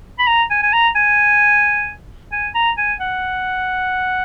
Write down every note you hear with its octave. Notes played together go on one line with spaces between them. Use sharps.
B5
A#5
G#5
G#5
A#5
G#5
G#5
A#5
G#5
F#5